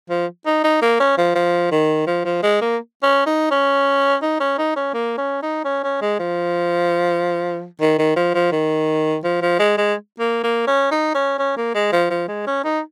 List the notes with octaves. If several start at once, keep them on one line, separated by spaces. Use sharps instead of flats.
F3
D#4
D#4
A#3
C#4
F3
F3
D#3
F3
F3
G#3
A#3
C#4
D#4
C#4
D#4
C#4
D#4
C#4
A#3
C#4
D#4
C#4
C#4
G#3
F3
D#3
D#3
F3
F3
D#3
F3
F3
G#3
G#3
A#3
A#3
C#4
D#4
C#4
C#4
A#3
G#3
F3
F3
G#3
C#4
D#4